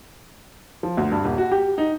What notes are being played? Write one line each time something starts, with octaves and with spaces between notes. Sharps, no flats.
F3
D2
G2
D#1
F#4
G4
D#4